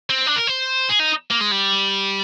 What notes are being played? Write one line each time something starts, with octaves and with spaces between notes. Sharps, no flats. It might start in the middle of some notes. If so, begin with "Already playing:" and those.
C4
D4
A#4
C5
G#4
D#4
A#3
G#3
G3